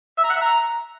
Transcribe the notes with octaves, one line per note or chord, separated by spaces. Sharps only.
E5
A#5
F#5
E5
A#5